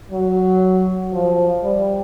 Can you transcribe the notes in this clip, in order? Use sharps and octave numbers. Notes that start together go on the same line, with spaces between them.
F#3
F3
G3